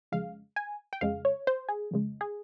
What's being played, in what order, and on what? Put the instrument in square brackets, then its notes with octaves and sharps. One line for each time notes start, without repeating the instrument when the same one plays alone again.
[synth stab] F2 C#3 G#3 F5
G#5
G5
F2 C#3 G#3 F5
C#5
C5
G#4
F2 C#3 G#3
G#4